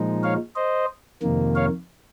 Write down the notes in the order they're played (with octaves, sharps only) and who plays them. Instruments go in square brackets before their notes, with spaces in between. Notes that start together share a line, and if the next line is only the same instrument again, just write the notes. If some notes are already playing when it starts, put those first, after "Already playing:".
Already playing: [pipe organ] A#2 F3 G#3 D#4
C#5 F5
C5 D#5
F2 C3 D#3 A#3
C#5 F5